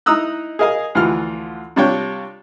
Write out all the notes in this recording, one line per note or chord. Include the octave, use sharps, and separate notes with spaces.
D#4 E4 A#5 D#6 E6 F#6
G#4 A#4 D#5 F5 G#5
D2 E3 F3 F4 F6
C3 G3 D4 F4 C#5 G5